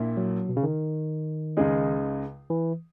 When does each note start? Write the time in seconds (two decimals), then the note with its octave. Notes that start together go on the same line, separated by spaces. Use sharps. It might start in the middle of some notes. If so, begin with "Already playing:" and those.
Already playing: A#1 A#2 A#3 E4
0.17 F#3
0.49 B2
0.57 C#3
0.63 D#3
1.57 C#2 C#3 G#3 D#4 G#4
2.50 E3